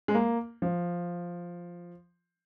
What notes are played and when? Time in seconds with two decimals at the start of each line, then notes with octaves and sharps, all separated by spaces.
0.08 G#3
0.15 A#3
0.62 F3